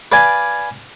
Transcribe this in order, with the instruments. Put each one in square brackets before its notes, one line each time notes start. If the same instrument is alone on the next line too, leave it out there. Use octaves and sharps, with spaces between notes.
[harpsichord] B4 D5 F5 G#5